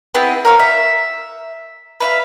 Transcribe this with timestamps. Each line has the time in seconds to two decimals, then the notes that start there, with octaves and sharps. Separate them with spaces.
0.15 B3 C4 E4 G#4
0.45 A#4 C#5 F5
0.60 E5
2.00 B4 E5 F5